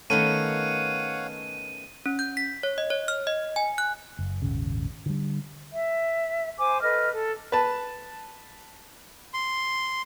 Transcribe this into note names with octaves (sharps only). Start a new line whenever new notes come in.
D#3 A3 B3 C#4 C#5 F5 F#5 D#7
C#4
G6
B6
C#5
D#5
C#5
F6
D#5
G#5
F#6
F#1
D#1 G#1 C#3
D3 G3
E5
C5 G#5 D6
A4 B4 D#5 F6
A4
B4 A5
C6